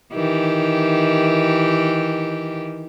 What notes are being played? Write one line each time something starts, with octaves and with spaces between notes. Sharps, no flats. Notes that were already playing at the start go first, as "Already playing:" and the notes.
D#3 E3 G4